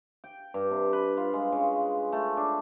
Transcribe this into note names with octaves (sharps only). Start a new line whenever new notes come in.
G5
G2
C3
B4
F4
G#3
C#3
A3
D4